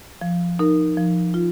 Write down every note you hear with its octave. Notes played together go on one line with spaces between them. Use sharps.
F3
D#4 A#4
F3
F4